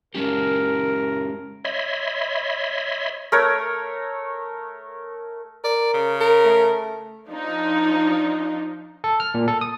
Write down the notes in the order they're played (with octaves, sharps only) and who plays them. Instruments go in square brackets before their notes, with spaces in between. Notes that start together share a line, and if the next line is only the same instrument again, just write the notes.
[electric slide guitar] G#3 C#4 G4 [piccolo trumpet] A#4
[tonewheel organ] C#5 D#5 E5 B5 C6
[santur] A3 A#4 C#5
[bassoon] A#4 [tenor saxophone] D5
[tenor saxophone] C#3
[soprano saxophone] A#4
[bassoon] A3
[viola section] F3 D4 D#4
[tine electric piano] A4
F6
A#2
A4
D#6